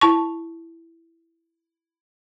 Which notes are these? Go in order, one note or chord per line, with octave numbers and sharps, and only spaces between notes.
E4 A5 C#6